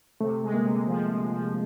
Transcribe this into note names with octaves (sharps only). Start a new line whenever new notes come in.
C3 A3
G#3
A#3
C3
F3
G#3
F3